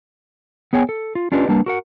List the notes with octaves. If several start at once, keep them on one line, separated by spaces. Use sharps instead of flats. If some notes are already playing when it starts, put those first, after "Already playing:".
B3 G#4 C#5 G5 G#5
A4
F4
C#4 D4 F4 G4 B4 D#5
G3 A#3 D4 B4 A5
F#4 A#4 F#5